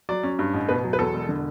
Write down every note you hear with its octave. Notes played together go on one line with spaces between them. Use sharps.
F#3 D5
C#4
G2
A1
B2 B4
F#3
B4
E2 A4
E1
D3